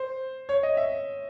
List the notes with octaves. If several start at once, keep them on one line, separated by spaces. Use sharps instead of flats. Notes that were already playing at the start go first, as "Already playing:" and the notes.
Already playing: C5
C#5
D#5
E5